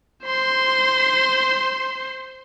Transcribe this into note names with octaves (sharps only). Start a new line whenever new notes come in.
C5 C6